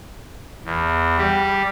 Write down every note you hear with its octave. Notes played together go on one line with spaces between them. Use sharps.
E2
G3